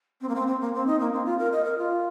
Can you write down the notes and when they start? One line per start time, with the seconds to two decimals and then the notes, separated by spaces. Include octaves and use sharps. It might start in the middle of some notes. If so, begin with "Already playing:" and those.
0.21 C4
0.29 A#3
0.35 C4
0.48 C4
0.61 A#3
0.74 C4
0.87 D#4
1.00 A#3
1.13 C4
1.26 F4
1.39 A#4
1.52 D#5
1.65 A#4
1.78 F4